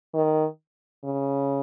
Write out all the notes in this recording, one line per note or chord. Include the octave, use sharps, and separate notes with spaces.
D#3
C#3